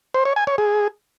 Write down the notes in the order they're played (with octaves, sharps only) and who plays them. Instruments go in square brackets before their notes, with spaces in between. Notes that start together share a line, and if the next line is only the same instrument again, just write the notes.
[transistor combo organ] C5
C#5
G#5
C#5
G#4